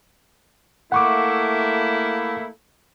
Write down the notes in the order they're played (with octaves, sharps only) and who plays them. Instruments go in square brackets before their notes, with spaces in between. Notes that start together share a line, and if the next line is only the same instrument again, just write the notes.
[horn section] A3 A#3 E4 [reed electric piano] F#5 C#6 D6